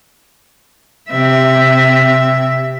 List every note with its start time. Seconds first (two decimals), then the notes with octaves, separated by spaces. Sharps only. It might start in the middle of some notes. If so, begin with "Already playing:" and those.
1.11 C3 E5